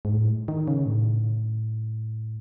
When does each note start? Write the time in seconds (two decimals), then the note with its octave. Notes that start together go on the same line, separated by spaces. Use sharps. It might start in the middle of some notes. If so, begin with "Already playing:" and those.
0.05 G#2
0.13 A2
0.48 D#3
0.68 C#3
0.86 A2